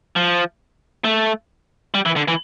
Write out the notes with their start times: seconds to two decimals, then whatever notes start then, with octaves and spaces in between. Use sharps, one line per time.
0.16 F3
1.04 A3
1.94 G3
2.06 E3
2.16 D3
2.28 E3